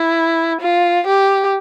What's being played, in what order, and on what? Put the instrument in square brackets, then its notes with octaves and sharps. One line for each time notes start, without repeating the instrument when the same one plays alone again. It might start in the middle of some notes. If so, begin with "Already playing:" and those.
Already playing: [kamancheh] E4
F4
G4